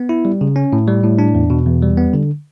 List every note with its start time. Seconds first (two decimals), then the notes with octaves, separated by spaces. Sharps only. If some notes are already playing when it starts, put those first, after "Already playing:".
Already playing: B3
0.09 E4
0.25 G3
0.41 C#3
0.56 C#4
0.73 A2
0.88 G3
1.03 A2
1.19 D4
1.35 E2
1.50 B2
1.66 E2
1.83 G3
1.97 B3
2.14 D3